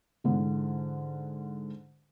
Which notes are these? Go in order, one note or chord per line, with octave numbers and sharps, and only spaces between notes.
G#2 D3 E3